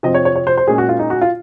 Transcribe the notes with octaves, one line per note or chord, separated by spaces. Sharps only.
F2 C3 F3 C4 D#5
C#5
C#5
C#5
C5
C5
A#2 G#3 C#4 G#4
F#4
F4
D#4
F#4
F4